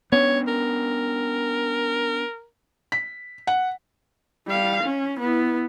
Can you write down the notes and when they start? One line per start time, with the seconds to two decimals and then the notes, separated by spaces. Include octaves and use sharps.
0.12 B3 C#4 D4 C#5
0.48 A#4
2.92 B6
3.47 F#5
4.46 G3 F5
4.83 C#4
5.20 B3 E4